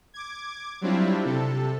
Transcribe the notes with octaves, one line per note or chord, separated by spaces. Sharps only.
D6 G#6
F#3 G3 C4 D4 E4 F4
C3 A4